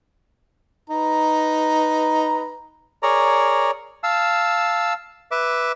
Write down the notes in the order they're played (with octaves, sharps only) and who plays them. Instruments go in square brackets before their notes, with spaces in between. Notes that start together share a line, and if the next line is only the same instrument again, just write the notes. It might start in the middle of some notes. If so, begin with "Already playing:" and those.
[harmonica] D#4 B4 A#5
[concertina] G#4 A#4 C#5 D5 A#5
F5 A5 E6
B4 E5 D6